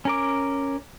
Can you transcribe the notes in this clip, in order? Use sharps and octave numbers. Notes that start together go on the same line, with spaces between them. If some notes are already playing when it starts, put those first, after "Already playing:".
C#4 A#4 D6